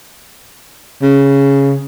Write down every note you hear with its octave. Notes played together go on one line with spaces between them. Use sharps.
C#3